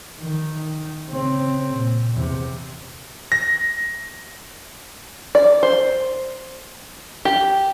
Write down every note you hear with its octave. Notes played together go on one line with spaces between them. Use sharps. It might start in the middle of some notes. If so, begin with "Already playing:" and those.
D#3
C#3 C4
A#2
E2 C3
A#6
D5
C5
G4